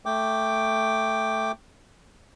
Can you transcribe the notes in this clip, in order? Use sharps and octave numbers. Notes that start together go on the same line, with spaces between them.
A3 G5 D6